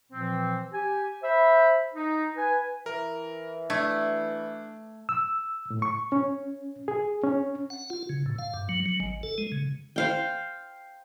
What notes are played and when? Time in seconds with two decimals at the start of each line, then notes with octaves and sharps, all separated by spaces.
0.11 A#2 E3 F3 C4
0.72 G4 G#5
1.22 C5 E5 B5
1.94 D#4
2.36 B4 G#5
2.86 E3 A#4
3.70 A3 D4 G#6
5.09 E6
5.70 A2
5.82 C#6
6.12 C#4
6.88 G#4
7.23 C#4
7.70 F#5
7.90 F4
8.09 C#3
8.26 A2
8.39 F5
8.54 G2
8.69 F#3
8.86 F#3
9.00 G#1
9.23 A4
9.38 G#3
9.52 C#3
9.96 C5 F5 G5